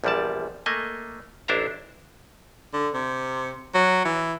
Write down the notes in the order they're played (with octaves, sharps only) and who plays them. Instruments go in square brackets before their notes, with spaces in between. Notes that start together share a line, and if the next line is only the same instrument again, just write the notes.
[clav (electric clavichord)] A#1 E2 F3 G3 D5 A5
A3 A#3 D#5 G#5
A1 D4 E4 C5 E5 A#5
[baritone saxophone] D3
C3
F#3
E3